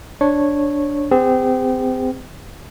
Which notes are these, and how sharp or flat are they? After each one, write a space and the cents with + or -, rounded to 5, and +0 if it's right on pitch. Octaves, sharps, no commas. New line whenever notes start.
D4 -5 C#5 -10
C4 -30 G#4 -45